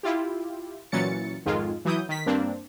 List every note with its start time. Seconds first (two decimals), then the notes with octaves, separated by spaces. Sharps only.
0.03 E4 F4 G4
0.92 A#2 E3 F#3 C#4 A6 C#7
1.45 G#1 F2 G#2 D#3 G#3 F4
1.85 E3 F#3 E4 D#6 G6
2.09 D#3 B6
2.26 G2 A#3 C4 D4